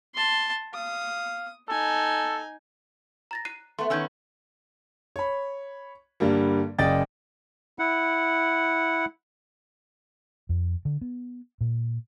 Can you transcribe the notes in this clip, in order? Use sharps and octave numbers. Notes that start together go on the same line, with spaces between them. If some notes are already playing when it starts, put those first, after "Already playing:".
A5 C6
F5 D#6
D#4 A4 G#5
A#5 A6 A#6
F#6 C7 D#7
A3 B3 C6
D#3 B3 C#4 E6 G6 G#6
C#5 B5
G2 D3 G3 A#3
F#1 C#3 D5 D#5 G5 A6
E4 F#5
F2
D3
B3
A#2